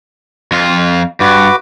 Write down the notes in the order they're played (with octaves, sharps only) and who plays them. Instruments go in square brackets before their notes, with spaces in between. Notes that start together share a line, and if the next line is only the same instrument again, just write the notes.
[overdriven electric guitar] F2 F4
[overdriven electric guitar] G2 [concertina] F#4 B4 D6